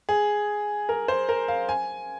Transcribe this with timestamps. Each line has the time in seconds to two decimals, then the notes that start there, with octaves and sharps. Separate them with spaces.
0.09 G#4
0.89 A#4
1.08 C5
1.29 A#4
1.48 F5
1.69 G#5